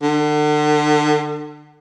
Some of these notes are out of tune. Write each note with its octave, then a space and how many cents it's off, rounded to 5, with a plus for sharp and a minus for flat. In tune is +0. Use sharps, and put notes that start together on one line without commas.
D3 +35